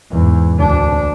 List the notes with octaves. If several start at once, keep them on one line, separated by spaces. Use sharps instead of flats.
E2 G#2
D2 D4